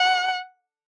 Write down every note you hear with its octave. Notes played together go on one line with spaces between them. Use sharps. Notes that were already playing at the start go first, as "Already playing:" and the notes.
Already playing: F#5